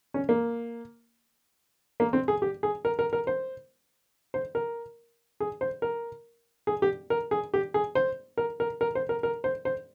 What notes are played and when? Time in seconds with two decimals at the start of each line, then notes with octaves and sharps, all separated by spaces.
0.14 C#4
0.29 A#3
2.00 A#3
2.13 C4
2.28 G#4
2.42 G4
2.63 G#4
2.85 A#4
2.99 A#4
3.13 A#4
3.27 C5
4.34 C5
4.55 A#4
5.40 G#4
5.61 C5
5.82 A#4
6.67 G#4
6.82 G4
7.10 A#4
7.31 G#4
7.54 G4
7.74 G#4
7.95 C5
8.38 A#4
8.60 A#4
8.81 A#4
8.95 C5
9.09 A#4
9.23 A#4
9.44 C5
9.65 C5